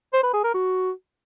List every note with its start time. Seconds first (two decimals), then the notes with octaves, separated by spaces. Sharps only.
0.13 C5
0.23 B4
0.34 G#4
0.44 A#4
0.54 F#4